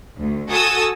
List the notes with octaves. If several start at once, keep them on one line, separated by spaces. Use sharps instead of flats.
D2
F#4 A4 G#5 A5 D#6 E6